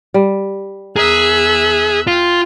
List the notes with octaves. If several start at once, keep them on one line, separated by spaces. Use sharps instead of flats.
G3
E2 G#4 A#4 E5 F#6
F4 G5